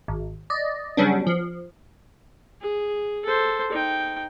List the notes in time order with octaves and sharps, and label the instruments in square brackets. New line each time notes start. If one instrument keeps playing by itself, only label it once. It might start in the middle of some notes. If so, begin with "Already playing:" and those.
[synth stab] G#1
D5 D#5
C#3 F#3 G3 B3 C#4 D4
F3
[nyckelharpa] G#4
A4 C5
D#4 G5